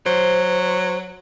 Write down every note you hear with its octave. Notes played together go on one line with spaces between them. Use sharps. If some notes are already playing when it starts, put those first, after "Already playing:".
F#3 C5